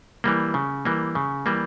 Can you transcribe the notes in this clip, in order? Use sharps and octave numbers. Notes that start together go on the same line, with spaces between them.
E3 G3 A#3
C#3
E3 G3 A#3
C#3
E3 G3 A#3